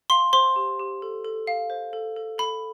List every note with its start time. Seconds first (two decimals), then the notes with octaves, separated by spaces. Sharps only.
0.10 F5 C6
0.33 C5 C6
0.56 G4
0.79 G4
1.02 A4
1.25 A4
1.47 F5
1.70 C5
1.93 A4
2.16 A4
2.38 A4 B5